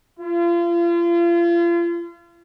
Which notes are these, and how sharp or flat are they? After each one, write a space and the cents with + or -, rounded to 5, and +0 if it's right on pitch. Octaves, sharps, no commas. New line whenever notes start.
F4 -35